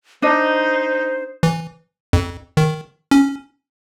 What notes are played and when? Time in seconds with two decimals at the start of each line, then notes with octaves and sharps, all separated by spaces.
0.22 D4 D#4 C5 D#5
1.43 E3
2.13 F2
2.57 D#3
3.11 C#4